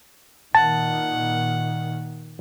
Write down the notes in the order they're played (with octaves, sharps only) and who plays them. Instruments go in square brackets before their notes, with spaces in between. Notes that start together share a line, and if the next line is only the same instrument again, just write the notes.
[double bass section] A#2 D#3 [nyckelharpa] F#5 [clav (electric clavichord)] A5